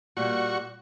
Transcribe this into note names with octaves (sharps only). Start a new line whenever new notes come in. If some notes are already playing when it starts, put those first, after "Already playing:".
A#2 G3 F#4 C#6